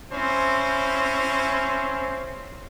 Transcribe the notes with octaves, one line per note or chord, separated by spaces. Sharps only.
C4 C#4 E4 C5